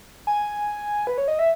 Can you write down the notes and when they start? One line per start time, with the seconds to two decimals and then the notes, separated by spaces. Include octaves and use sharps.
0.27 G#5
1.07 B4
1.18 C#5
1.28 D#5
1.39 E5